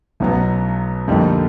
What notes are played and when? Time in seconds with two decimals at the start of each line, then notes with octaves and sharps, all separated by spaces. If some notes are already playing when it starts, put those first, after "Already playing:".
0.20 B1 B2 F#3 B3
1.08 F2 D3 G3 A#3 D#4